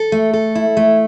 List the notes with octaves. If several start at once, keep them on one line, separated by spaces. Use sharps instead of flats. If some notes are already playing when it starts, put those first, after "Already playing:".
Already playing: A4
A3
A4
E4
A3